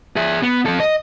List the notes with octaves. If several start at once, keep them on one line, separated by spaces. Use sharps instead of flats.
G#4 E5
B3
F2 A4
D#5